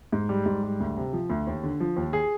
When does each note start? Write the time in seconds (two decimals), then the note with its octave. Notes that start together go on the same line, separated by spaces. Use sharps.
0.12 G#2
0.29 G3
0.46 G#2
0.63 G3
0.80 D2
0.97 C3
1.13 F3
1.30 D2
1.47 D#2
1.63 D3
1.80 F3
1.96 D#2
2.13 G#4